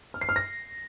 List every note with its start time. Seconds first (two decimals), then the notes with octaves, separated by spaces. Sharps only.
0.14 F6
0.21 C7
0.29 F6
0.36 A#6